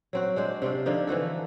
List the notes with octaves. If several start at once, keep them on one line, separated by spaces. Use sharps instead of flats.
F#3 C4 F#4
G#3 D4 C5
C3 C4 D4 F4
D3 F3 D4 D#4
E3 F3 F#4 A4